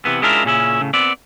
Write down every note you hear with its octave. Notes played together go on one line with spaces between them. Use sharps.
C3 E3 B3
G#3 C#4 D4 E4 F4 A#4
A#2 C#3 C#4 E4
A2 C#3
B3 C4 D5